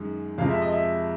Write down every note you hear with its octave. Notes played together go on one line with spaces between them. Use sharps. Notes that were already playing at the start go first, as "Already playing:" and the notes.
Already playing: F#2 D#3 G#3
F2 C3 F3 G#3 F5
E5
D#5
E5